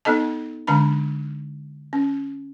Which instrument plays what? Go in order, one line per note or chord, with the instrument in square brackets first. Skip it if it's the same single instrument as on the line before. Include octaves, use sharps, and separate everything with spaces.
[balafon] B3 D#4 A4 D#5 A5
D3 G#3 D4 A5 B5
C#4